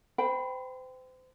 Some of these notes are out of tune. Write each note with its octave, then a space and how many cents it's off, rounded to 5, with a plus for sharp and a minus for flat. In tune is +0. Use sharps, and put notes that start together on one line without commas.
C5 -35 G5 +0 B5 +0